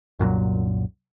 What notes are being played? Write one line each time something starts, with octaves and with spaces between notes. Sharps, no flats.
C2 F#2 A#2 F#3